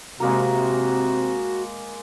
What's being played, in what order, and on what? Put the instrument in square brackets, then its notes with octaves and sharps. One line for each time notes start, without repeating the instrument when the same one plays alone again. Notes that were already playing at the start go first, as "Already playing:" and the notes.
[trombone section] C3 [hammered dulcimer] G#3 A#3 A#5 [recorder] F#4